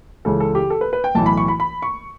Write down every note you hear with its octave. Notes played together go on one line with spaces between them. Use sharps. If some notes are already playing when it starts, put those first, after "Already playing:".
C#2 C#3 E3 A4
A4
G4
A4
B4
B4
G5
B1 A2 E3 A5
B5
C#6
B5
B5
C#6